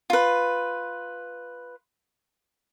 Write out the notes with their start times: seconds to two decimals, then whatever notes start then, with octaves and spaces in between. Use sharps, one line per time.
0.10 F4 B4